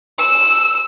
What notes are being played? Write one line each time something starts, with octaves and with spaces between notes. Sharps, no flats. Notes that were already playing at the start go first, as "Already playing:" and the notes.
E6